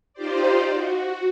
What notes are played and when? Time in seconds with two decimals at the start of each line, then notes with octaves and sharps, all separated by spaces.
0.14 D#4 F4 G4 C5 D5
0.71 F#4